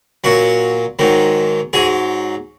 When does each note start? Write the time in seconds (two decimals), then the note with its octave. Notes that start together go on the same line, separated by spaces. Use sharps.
0.24 A#2 F#3 F#4
0.99 G#2 D#3 F#3
1.73 G#2 F#3 G#4